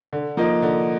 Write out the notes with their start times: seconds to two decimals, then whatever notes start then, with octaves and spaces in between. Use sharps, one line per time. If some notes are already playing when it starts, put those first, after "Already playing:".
0.13 D3
0.37 F3 A#3 D#4
0.62 D3